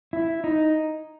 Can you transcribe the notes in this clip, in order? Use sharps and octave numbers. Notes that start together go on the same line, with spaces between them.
E4
D#4